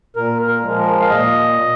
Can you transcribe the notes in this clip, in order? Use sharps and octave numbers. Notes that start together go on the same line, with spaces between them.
A#2 A#4
A#4
F3 G#3
A#4
F5
A#2 D#5